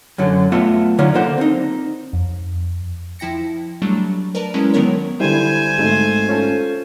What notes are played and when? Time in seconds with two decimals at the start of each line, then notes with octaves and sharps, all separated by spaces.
0.18 F#2 D3 F#3
0.52 A3 B3 F4 E5 F#5
0.99 D3 F#3 D#4 F4
1.14 D3 A#3 C5 F#5
1.38 C4 D#4
2.13 F2
3.19 F3 E4 G5 A#6 C#7
3.82 F#3 G3 A3 D4
4.35 A#4 B4 D5 A5 A#5
4.54 F#3 G#3 C#4 E4
4.74 D3 D#3 F#3 B3 A#4 C#5
5.20 D3 G3 E4 C5 G#5
5.78 G#1 A3 D#4
6.29 C#4 F4 A4